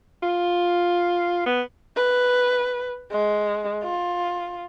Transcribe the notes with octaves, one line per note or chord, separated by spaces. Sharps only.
F4
B3
B4
G#3
F4